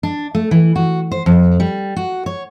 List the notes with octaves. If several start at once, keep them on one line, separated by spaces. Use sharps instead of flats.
D4
A3
E3
F#4
C5
F2
G3
F#4
C#5